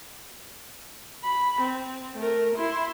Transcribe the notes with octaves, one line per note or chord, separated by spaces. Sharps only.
B5
C4
A3 A#4
E4 C6